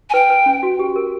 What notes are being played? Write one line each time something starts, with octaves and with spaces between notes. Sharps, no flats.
G#5
B4 G5
B4
C#4
F#4
G4
A#4